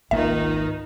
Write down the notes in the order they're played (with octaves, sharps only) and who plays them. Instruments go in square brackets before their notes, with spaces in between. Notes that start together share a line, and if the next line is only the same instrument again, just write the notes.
[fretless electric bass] G#1 A#3 [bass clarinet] C#2 [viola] D#3 D#4 [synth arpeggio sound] E5